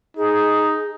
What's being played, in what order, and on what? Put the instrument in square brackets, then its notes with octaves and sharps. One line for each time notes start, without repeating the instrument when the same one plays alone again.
[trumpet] D#4 [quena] G#4